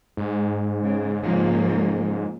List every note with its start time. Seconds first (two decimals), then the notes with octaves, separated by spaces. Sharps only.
0.17 G#2
0.83 C#3
1.23 G#2 C#3 F3 A#3